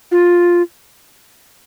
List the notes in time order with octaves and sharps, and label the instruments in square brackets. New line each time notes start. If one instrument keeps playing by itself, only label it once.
[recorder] F4